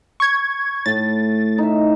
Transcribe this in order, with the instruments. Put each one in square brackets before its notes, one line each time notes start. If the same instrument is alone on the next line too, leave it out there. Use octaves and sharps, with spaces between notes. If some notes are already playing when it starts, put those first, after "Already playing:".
[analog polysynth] C#6 G#6
[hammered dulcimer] A2 [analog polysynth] A6
[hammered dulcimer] D#4 E5